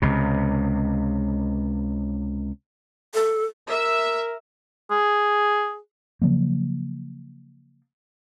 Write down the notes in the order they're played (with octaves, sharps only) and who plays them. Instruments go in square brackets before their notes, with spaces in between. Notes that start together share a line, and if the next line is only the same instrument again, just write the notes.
[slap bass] C#2 C3
[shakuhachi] A4
[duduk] A#4 [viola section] E5
[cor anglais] G#4
[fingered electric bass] C#3 F3 F#3 A#3